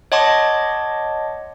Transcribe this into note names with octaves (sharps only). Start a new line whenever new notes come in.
C#5 D#5 F#5 A5 C6 D6